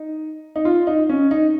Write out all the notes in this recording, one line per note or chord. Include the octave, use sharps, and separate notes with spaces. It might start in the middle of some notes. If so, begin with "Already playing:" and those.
Already playing: D#4
D#4
F4
D#4
C#4
D#4